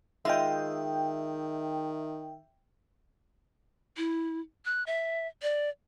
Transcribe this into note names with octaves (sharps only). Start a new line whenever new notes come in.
D#3 G#3 F4 D#5 E5 G5
E4
F#6
E5
D5